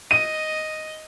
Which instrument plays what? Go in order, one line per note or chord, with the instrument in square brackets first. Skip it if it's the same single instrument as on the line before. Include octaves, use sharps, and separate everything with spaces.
[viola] D#5 [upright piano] D#7